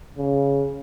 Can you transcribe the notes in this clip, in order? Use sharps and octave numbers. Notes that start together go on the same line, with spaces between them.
C#3